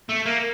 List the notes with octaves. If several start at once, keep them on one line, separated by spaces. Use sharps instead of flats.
A3
A#3